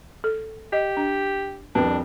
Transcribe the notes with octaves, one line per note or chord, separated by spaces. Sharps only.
A4
G4 D#5
D4
C2 F2 D4 B4